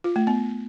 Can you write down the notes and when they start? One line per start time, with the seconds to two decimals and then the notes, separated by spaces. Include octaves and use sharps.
0.04 F4
0.16 A3
0.27 B3